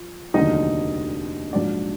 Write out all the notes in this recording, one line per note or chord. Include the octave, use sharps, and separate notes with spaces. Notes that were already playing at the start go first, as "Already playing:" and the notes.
Already playing: F3
F1 D#2 D3 F#3 D#4 D#5
A#1 G#2 F#3 D4 D5